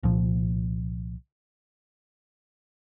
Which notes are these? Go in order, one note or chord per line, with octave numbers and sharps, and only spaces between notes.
C2 A#2 F3